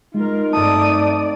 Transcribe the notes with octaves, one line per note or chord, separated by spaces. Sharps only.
G#3 D#4 F4 A#4
G2 A3 C4 D5 A5 D#6